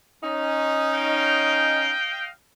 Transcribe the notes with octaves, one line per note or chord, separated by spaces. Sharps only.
C#4 D#4
D#5 F5 G5